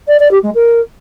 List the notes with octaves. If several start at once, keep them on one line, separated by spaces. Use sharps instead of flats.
D5
D5
G4
G#3
A#4